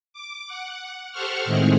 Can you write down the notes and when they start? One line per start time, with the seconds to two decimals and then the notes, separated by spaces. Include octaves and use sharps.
0.13 D6
0.47 F#5
1.12 G4 A4 C5 F#5 C#6 F6
1.45 A2 D#3 G#3 C4 E4 G#4